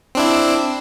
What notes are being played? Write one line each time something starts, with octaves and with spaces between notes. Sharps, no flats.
C4 D4 E4